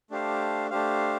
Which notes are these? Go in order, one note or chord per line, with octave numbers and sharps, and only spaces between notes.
A3 D4 G4 C5 F5
A3 D4 G4 C5 F5